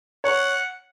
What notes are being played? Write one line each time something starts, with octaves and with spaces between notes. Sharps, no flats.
C#5 F#5